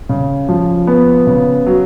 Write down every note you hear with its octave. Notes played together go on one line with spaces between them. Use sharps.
C#3
F3
B3
C#3
F#3